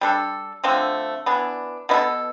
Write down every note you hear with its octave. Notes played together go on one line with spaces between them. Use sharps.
G3 D4 A4
D3 F3 A3 C4
E3 B3 D4
B2 B3 E4 A4